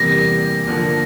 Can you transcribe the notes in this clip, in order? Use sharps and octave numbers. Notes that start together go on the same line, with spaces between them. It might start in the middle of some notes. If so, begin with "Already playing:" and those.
Already playing: E2 C3 E3 G3 A#3 A#6
D3 F3 A#3